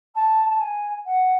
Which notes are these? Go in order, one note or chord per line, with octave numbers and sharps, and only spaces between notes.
A5
A5
G#5
F#5